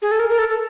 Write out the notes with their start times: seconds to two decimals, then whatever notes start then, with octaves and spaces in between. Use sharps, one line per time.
0.02 G#4
0.11 A4
0.19 A#4
0.30 A#4
0.38 A4
0.49 A4